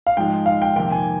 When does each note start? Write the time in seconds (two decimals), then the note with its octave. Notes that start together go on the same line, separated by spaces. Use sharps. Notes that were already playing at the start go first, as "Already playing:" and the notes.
0.07 F5
0.17 G#2 F3 G#3 G5
0.46 F5
0.62 G5
0.76 F2 C3 D#3 A#3 G5
0.91 G#5